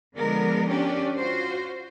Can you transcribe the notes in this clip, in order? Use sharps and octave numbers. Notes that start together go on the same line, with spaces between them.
D3 F3 G#3 B3 A#4 D5
C#4 D4 G4 D5
F4 F#4 C5